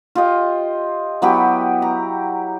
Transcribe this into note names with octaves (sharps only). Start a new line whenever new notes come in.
F4 G4 D#5
F#3 B3 E4 G4
A#5